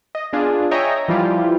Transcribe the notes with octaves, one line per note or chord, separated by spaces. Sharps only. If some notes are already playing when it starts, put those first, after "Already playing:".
D#5
B3 D4 F4 G#4
C#5 D#5 E5 G5 G#5 A#5
E3 F3 G3 E4 F4 G4